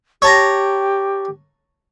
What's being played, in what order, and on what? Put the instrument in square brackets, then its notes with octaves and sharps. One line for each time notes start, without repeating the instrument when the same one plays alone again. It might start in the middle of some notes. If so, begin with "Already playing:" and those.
[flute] G4 [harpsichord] C#5 A5 A#5